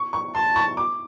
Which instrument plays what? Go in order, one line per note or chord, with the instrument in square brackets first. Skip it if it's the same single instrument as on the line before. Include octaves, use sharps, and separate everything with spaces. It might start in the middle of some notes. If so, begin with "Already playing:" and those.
Already playing: [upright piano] C#6
C#6
[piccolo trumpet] A5 [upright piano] C6
[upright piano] C#6
D6